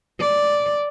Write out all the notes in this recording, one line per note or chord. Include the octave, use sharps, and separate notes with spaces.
D5